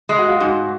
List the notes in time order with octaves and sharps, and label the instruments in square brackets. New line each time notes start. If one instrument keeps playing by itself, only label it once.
[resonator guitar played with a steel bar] G#3
[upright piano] F#4
F4
[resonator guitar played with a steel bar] G#2 [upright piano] F#4